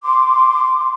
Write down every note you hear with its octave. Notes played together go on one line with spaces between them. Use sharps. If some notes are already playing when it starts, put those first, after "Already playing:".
C6 D6